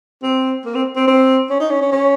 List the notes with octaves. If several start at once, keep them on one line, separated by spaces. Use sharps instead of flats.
C4
A#3
C4
C4
C4
C#4
D#4
C#4
C#4
C#4